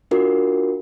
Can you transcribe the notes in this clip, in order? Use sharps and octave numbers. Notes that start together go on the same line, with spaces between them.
D4 F4 F#4 A#4